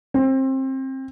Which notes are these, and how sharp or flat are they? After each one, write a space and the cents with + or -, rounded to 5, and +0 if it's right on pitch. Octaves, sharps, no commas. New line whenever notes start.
C4 +25